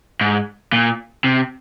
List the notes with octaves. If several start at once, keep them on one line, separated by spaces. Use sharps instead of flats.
G#2
A#2
C3